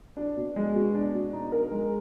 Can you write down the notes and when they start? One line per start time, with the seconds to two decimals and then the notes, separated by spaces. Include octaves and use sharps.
0.17 D4
0.37 B2
0.56 G#3
0.75 B2
0.94 D4
1.14 B2
1.33 D#4
1.52 A#4
1.72 G#3